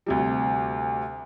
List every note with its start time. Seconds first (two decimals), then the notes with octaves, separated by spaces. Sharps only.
0.06 D2 C3 G3